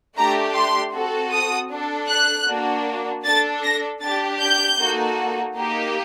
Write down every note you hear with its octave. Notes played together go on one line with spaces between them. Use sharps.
A3 D4 G4 A#5
C6
C4 F#4 A4
D#6
D4 A4
F#6
A#3 D4 F#4
D4 A4 A6
A#6
D4 G4 A6
G6
A#3 D#4 F#4 A4
A#3 D#4 G4